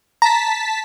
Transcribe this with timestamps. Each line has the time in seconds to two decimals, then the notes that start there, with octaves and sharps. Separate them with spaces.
0.22 A5 A#5 B6